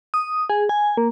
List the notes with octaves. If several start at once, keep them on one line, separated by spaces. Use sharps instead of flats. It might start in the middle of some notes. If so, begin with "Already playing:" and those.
D#6
G#4
G#5
A#3